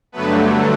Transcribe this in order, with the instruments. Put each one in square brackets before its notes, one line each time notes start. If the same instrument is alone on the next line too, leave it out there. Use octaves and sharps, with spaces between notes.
[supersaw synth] G2 D3 F#3 A3 B3 B4